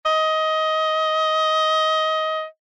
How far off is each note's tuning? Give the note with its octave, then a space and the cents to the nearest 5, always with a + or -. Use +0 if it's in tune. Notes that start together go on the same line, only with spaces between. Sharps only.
D#5 +20